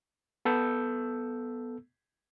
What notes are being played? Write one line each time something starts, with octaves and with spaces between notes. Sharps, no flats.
B3 A4 E6 G6